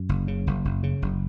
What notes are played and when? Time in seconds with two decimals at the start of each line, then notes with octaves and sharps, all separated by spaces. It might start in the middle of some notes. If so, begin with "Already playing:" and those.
Already playing: F#2
0.09 F#1
0.28 C#3
0.47 F#1
0.65 F#1
0.83 C#3
1.02 F#1